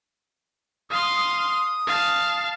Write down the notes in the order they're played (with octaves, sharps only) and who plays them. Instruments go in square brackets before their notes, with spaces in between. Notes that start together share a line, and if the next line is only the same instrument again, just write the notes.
[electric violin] F5 C6 [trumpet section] D#6
[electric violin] F5 A5